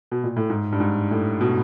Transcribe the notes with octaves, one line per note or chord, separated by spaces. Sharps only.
B2
A#2
A2
G#2
G2
G#2
A2
B2